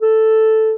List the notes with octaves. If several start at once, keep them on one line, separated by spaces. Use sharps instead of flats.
A4